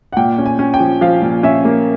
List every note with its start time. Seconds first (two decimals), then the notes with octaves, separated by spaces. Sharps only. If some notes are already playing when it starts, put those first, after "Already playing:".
0.13 F#5
0.17 A#2 G5
0.39 C#4
0.46 G#5
0.59 C#4
0.74 G5
0.80 F3
1.01 F3 F5
1.22 A#2
1.43 C#4 E5
1.65 A#3